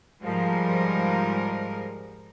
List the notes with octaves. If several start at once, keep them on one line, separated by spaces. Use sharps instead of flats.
G#2 F3 G3 G#3 A#4